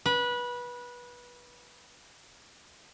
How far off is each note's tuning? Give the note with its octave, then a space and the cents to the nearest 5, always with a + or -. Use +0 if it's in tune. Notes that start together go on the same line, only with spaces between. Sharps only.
B4 -20